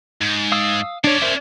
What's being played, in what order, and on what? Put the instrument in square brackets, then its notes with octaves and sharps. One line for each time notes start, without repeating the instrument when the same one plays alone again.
[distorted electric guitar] G#2
[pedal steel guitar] F5 D#6 E6
[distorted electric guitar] C#4 D5 [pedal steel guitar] D4 C#5
[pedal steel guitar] A#4 C5 E5